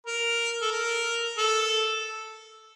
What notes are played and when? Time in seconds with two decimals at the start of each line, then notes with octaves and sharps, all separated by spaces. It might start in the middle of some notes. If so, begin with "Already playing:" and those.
0.06 A#4
0.62 A4
0.72 A#4
1.38 A4